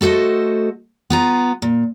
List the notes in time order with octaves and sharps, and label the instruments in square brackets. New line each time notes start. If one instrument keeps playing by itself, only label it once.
[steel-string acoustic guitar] A3 F#4 A4 C5 D#5
B3 F4 A#5
A#2